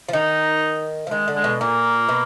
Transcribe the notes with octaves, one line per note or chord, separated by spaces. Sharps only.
F3
D#3 D#4
F3
D#3 G#3
D3
G#3
B2
A#2 A#3
B2